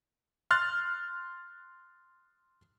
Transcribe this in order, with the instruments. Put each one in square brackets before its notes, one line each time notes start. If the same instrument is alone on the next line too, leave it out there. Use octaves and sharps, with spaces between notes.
[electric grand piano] C6 F6 F#6 A6